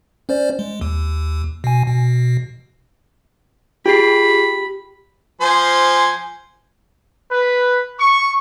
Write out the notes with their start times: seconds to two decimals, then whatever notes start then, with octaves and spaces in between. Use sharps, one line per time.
0.29 C#4 C5 D5
0.59 G#3
0.81 D#2
1.64 B2 G#5
1.87 B2
3.86 F4 G4 G#4 B5 C7
5.41 F3 C5 G#5
7.31 B4
7.98 C#6